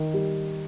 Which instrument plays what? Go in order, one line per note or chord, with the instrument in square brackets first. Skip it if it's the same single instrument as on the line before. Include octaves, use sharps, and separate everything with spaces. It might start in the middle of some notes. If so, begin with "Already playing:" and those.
Already playing: [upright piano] D#3
G3